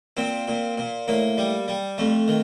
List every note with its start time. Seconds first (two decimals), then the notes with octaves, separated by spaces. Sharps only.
0.17 A#2 C4
0.48 A#2
0.78 A#2
1.08 A2 A#3
1.38 G3
1.68 G3
1.98 F2 A3
2.28 D#3